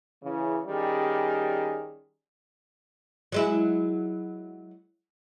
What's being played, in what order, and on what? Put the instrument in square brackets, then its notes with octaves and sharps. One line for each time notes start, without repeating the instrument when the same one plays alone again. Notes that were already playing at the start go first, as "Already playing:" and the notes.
[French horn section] C#3 E3
D#3 G3 C#4 G#4
[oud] F#3 G#3 E4